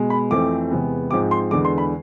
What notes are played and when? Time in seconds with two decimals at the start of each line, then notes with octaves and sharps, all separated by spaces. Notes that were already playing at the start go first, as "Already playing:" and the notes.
Already playing: B2 G#3 B3
0.10 B5
0.31 F2 E3 A3 C4 D6
0.71 E2 C3 G#3 B3
1.11 G#2 F3 G#3 C4 D6
1.31 C6
1.51 E2 D3 G#3 B3 D6
1.65 C6
1.78 B5